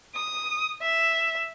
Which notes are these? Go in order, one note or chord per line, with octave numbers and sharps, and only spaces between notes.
D#6
E5